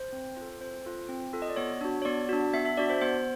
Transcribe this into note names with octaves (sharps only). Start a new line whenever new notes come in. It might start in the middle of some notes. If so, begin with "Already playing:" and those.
Already playing: C5
C4
F4 A4
C4 C5
F4 A4
C4
F4 A4
D#5
D5
B3 C#5
D4 F#4
C#5
B3 D5
D4 F#4
B3 E5
E5
D4 F#4 D5
C5
B3 C5